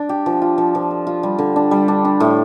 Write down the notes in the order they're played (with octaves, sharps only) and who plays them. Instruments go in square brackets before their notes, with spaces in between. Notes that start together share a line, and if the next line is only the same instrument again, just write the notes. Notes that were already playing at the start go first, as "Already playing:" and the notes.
Already playing: [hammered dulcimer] D4
G4
F3
F4
F3
F3
A4
F4
G3
D3
D4
G3
D4
D4
A2